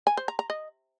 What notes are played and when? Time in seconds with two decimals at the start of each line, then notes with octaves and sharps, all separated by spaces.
0.07 G#5
0.17 C5
0.28 A#5
0.39 A#5
0.50 D#5